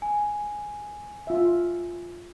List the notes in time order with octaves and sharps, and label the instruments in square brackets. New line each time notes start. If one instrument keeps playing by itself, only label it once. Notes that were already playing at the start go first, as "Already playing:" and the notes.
[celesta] G#5
[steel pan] F4 E5